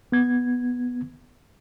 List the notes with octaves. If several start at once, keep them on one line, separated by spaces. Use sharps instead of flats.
B3 G#6